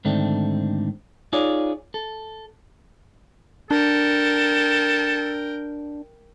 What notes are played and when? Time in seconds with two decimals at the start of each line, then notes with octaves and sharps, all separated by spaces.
0.05 G#2 D3 D#3 A3 C4 D4
1.33 D#4 F4 G#4 C#5 D5
1.94 A4
3.71 D4 A4 A#4 G5